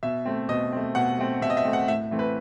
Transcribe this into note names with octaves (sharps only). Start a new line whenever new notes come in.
B2 E5
A3 C4
B2 D#5
A3 C4
B2 F#5
A3 C4
B2 E5
D#5
E5
A3 C4
F#5
A2 E5
E3 A3 C4
B4